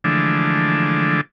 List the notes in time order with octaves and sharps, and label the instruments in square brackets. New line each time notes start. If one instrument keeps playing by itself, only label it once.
[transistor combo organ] D3 E3 F3 G#3 A3 D4